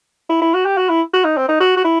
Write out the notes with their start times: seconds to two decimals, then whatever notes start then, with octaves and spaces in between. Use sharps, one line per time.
0.30 E4
0.41 E4
0.54 F#4
0.66 G4
0.77 F#4
0.89 E4
1.13 F#4
1.24 D#4
1.37 C4
1.48 D#4
1.60 F#4
1.77 F#4
1.85 E4